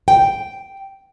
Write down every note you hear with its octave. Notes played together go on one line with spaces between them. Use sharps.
G5